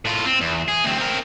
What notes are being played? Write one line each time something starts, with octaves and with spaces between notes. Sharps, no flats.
A2 F4
C4
E2
G#4
D2 C4
C4 A#4